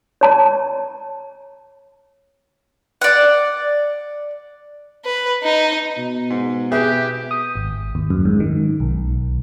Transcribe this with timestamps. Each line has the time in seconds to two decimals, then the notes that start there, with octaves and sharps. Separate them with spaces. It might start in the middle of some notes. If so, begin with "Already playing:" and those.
0.21 C#5 A5 A#5
3.01 D5 F#5
5.05 B4
5.43 D#4
5.98 B2
6.30 G#2
6.72 G4 G#4 B4 E5
7.31 D#6
7.56 G#1
7.95 D#2
8.10 F#2
8.25 G#2
8.40 D#3
8.80 B1